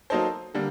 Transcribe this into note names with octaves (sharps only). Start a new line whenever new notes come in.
F#3 A#3 D#4 A4 C5
D3 G3 A#3